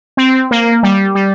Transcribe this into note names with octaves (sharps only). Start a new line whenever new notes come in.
C4
A#3
G3
G3